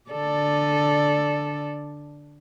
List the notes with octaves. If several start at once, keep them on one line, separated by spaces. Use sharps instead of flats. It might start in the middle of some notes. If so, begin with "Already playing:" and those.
D3 A4 D5